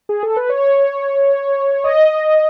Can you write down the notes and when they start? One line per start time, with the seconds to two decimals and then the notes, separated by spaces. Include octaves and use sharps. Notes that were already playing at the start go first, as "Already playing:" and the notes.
0.09 G#4
0.23 A4
0.37 B4
0.49 C#5
1.84 D#5